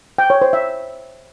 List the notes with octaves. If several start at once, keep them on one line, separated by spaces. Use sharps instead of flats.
G5
C#5
C5
E5